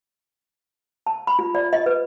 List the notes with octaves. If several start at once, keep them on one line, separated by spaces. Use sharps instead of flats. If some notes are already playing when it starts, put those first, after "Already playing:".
A5
B5
F4
D5
D#5
B4